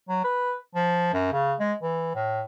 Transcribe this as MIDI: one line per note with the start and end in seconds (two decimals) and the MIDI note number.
0.09 0.24 54
0.24 0.55 71
0.75 1.10 53
1.13 1.32 42
1.33 1.55 49
1.60 1.74 56
1.82 2.12 52
2.15 2.42 45